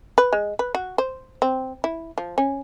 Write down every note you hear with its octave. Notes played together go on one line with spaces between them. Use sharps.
B4
G#3
B4
F#4
C5
C4
E4
F3
C#4